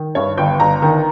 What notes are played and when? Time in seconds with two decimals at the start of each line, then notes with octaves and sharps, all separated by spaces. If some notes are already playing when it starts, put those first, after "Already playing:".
Already playing: D#3
0.15 G2 C#5
0.37 G1 G5
0.60 G1 A#5
0.82 D#3